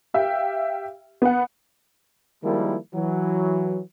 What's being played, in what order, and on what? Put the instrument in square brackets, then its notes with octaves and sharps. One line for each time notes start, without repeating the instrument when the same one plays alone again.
[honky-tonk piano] G4 E5 F5 G5
B3 F#5
[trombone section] D#3 F3 G3 G#3 A#3 E4
E3 F#3